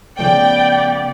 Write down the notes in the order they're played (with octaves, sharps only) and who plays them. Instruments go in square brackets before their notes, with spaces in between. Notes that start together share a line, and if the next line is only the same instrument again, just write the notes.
[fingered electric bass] C#3 F3 A3 [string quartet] B3 D5 [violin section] G5